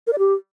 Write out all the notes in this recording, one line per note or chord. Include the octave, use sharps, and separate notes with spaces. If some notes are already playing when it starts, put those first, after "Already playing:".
A#4
D5
G4